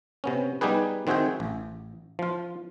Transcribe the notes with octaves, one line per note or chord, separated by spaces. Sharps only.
C3 B3 C#4
G3 B3 D#4 G4 G#4 B4
D#3 C4 F#4 G#4 E5 G5
A1
F3 F4